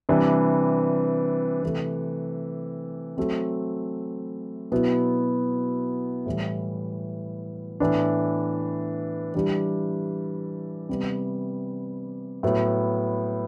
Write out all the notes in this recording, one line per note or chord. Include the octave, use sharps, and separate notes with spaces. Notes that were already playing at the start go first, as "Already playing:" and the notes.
C3 E3 G3 D4
C3 E3 A3
F#3 A3 C4
B2 F#3 B3 E4
A2 E3 G3
A2 E3 B3 D4
E3 G3 D4 G4
C3 G3 B3
A2 F#3 B3